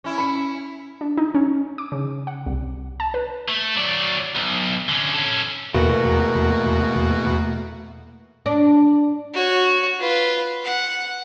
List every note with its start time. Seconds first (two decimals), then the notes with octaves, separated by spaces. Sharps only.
0.04 C#4 E4
0.18 B5 C#7
1.01 D4
1.17 D#4
1.34 C#4
1.78 D6
1.92 C#3
2.27 F#5
2.46 C2
3.00 A5
3.14 B4
3.49 A3
3.77 F#3 D5
4.36 B1
4.89 D3 C#4
5.14 C#4 A4
5.74 E2 B2 A3 A#3 F#4
8.46 D4
9.34 F#4 C#5
10.00 F4 B4
10.64 F#5